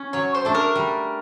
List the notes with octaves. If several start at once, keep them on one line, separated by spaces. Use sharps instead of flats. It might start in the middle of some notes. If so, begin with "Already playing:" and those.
Already playing: C#4
F#3 C#5
C5
A3 D4
A#4
G3